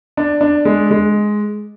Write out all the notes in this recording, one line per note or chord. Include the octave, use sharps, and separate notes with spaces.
D4
D4
G#3
G#3